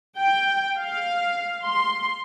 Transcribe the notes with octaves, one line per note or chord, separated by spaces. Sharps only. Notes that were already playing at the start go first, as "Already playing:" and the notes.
G5
F5
C6